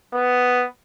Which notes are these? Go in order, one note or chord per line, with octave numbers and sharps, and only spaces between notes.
B3